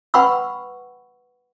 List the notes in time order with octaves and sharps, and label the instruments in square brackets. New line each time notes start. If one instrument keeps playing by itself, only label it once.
[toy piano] B4 F#5 G5 B5 C#6 E6